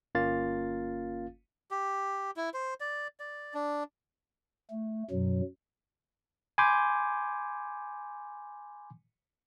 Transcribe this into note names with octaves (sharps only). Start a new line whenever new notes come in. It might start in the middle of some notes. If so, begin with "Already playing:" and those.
G1 A#3 C#4 F4 F5 A6
G4
E4
C5
D5
D5
D4
A3
F#2 B2 F#3
G#5 B5 C6 D6 G6